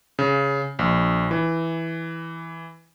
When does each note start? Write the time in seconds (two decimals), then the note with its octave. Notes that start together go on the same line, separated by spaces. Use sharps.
0.19 C#3
0.79 A#1
1.31 E3